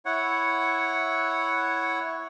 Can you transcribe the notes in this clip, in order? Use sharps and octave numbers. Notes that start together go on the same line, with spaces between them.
E4 C#5 F#5